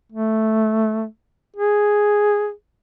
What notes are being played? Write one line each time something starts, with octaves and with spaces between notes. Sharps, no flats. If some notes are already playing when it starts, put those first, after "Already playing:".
A3
G#4